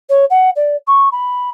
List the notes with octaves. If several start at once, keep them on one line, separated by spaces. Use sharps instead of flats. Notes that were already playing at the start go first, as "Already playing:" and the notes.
C#5
F#5
D5
C#6
B5